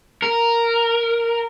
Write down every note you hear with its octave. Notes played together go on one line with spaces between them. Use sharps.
A#4